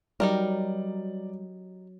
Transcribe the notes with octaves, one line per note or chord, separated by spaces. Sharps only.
F#3 G3 D#4 G4 A#4 D5